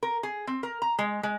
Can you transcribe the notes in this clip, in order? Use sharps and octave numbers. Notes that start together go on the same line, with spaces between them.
A#4
G#4
C4
A#4
A#5
G#3
G#3